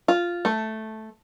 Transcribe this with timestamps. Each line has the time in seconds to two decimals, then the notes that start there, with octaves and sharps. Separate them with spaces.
0.08 F4
0.45 A3